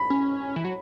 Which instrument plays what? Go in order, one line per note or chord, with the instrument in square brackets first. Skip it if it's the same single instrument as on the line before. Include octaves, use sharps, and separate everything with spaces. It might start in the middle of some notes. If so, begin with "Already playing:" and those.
Already playing: [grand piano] B5
[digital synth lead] C#4
E3
F#3